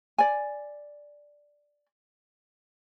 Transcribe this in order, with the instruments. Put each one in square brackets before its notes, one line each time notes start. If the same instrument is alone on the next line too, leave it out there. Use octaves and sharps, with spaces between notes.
[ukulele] D5 G#5